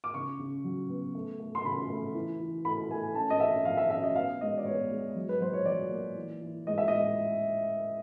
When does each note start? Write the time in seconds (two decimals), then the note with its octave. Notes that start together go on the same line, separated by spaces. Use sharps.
0.04 D6
0.14 C#3 C#6
0.39 C#3
0.64 F#3
0.90 B3
1.15 A3
1.39 A3
1.55 C6
1.64 C#3 B5
1.90 A3
2.14 E3
2.40 E3
2.65 A3 B5
2.90 A3 G#5
3.15 C#4 A5
3.30 D#5
3.40 C#4 E5
3.65 F3 F5
3.77 E5
3.90 C#4 E5
4.04 D#5
4.15 B3 F5
4.41 G#3 D#5
4.58 D5
4.66 B3 C#5
4.90 G#3
5.15 F#3
5.29 B4
5.40 F#3 C5
5.53 C#5
5.65 F#3 D5
5.91 A#3
6.16 E3
6.41 E3
6.67 G#3 D#5
6.78 E5
6.88 G#3 D#5